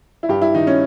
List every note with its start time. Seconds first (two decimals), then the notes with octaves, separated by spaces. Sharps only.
0.23 E4
0.29 G2 G4
0.42 E4
0.54 D#3 D#4
0.67 C#4